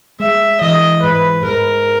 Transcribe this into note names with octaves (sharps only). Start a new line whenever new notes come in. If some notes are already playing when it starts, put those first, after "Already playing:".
G#3 E5
E3 D#5
G#2 B4
G#2 A#4